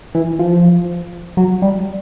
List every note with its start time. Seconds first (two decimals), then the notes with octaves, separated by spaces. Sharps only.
0.15 E3
0.39 F3
1.37 F#3
1.62 G3